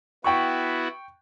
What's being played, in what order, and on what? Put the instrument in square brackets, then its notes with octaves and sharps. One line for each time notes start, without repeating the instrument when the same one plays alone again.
[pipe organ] B3 E4 F#4 [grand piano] G5 C#6